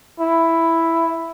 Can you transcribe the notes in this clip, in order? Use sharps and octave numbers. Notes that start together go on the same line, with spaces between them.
E4